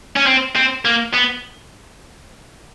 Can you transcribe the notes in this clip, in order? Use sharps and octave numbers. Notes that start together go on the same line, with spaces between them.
C#4
C4
C4
A#3
B3